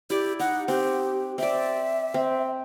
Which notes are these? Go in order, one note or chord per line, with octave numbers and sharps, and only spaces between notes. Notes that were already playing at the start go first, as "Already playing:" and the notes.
E4 G4 D5
D#4 F#5
C4 G4
C4 D5 E5
C4